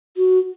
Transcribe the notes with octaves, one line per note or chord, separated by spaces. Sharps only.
F#4